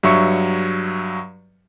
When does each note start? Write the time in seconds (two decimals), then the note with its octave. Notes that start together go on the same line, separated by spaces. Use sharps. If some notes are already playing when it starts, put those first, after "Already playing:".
0.03 G2 F#3 E5 C#6 E6 C#7